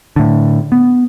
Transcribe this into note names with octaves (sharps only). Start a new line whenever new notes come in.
A2 D3
B3